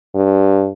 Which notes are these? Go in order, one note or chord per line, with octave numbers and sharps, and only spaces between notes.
G2